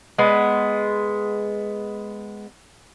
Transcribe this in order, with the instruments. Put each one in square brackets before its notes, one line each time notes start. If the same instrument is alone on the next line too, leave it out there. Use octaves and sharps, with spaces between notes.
[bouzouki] G#3 B3